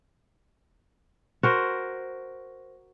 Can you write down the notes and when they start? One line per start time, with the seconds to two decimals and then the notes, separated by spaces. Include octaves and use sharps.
1.43 F#4 A#4 C5